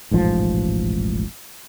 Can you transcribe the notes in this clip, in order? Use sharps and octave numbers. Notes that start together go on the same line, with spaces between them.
E1 A1 G#2 F3